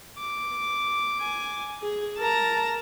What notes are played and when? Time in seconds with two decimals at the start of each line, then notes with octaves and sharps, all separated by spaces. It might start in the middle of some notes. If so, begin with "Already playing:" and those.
0.18 D6
1.21 G#5
1.82 G#4
2.19 A#4 A5 A#5